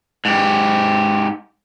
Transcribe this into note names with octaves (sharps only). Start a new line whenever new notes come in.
G#2 G4